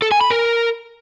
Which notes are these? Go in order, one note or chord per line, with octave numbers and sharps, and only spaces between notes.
A4
G#5
B5
A#4